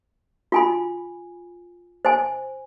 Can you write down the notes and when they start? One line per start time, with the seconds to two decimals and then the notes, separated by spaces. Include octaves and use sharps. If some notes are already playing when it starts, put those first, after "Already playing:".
0.52 F4 G#5 B5
2.05 C5 G#5